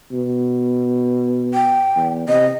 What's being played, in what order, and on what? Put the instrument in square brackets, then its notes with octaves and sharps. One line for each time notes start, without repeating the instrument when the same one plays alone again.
[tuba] B2
[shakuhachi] G5
[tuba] E2
[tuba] C3 [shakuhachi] D#5